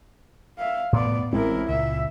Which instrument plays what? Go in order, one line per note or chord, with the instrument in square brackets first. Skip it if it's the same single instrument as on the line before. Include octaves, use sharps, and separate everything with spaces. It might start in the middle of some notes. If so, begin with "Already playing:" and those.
[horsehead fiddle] E5 F5
[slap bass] A2 [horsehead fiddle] B3 D5
[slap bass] A1 G#3 C4 [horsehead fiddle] E4 A#4
[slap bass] C#2 A#2 [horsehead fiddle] E5